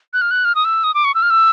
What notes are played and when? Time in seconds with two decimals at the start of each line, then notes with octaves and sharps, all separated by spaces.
0.13 F#6
0.21 F6
0.31 F#6
0.45 F6
0.55 D#6
0.65 E6
0.84 D#6
0.94 D6
1.05 C#6
1.15 E6
1.22 F6
1.30 E6